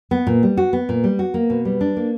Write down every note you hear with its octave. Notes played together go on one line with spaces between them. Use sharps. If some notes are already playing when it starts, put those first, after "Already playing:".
B3
A#2
G3
F#4
B3
A#2
G3
F#4
A#3
B2
G3
D4
A#3